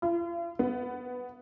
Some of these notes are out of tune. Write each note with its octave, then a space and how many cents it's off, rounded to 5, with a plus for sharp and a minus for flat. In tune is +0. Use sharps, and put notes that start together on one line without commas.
F4 -45
B3 +5